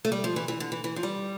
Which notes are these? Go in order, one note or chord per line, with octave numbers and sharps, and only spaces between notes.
A3
G3
F3
E3
E3
D3
E3
E3
F3
G3